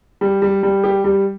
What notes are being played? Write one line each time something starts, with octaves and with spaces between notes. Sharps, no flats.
G3
G3
G3
G4
G3